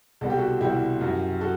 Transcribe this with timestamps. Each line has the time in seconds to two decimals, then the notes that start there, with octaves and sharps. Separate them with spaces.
0.21 C2 B2 G3 A4
0.30 G4
0.38 F#4 A4
0.61 C2 B2 G3 E4 G4
1.01 F#2 F#3
1.41 F#4 A4